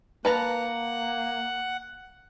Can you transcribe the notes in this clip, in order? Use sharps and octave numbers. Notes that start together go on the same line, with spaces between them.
A#3 B4 F#5 A5 A#5